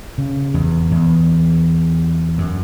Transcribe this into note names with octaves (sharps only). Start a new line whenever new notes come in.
C#3
E2
E2
F#2